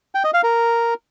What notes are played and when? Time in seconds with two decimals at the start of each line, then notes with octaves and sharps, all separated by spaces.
0.15 G5
0.24 D#5
0.34 F5
0.43 A#4